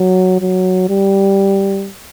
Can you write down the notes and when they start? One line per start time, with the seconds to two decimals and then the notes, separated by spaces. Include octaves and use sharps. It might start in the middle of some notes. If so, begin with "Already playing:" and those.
Already playing: F#3
0.41 F#3
0.90 G3